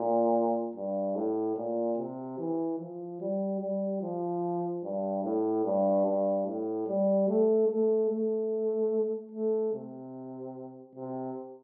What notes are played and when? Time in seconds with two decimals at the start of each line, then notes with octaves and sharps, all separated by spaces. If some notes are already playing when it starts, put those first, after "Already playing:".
Already playing: A#2
0.75 G2
1.15 A2
1.56 A#2
1.97 C3
2.39 E3
2.79 F3
3.20 G3
3.61 G3
4.01 F3
4.83 G2
5.24 A2
5.65 G2
6.05 G2
6.46 A2
6.87 G3
7.28 A3
7.69 A3
8.09 A3
9.32 A3
9.73 C3
10.95 C3